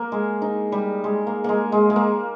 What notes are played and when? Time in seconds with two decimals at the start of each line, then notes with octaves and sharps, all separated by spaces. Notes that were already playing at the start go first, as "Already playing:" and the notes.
Already playing: A#3
0.12 G#3
0.42 D#4
0.72 G3
1.04 G#3
1.27 A#3
1.44 G#3 A#3
1.72 G#3
1.90 G#3
1.96 A#3